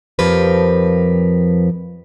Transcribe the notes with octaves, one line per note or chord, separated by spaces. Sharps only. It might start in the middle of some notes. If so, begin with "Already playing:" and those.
F2 F3 G4 A#4 B4